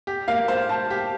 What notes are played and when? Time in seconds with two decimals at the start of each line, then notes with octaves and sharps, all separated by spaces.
0.07 G4
0.28 A#3 F5
0.48 C5 F5
0.69 C5 A5
0.90 G4